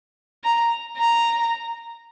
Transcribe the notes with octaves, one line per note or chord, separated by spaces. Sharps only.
A#5
A#5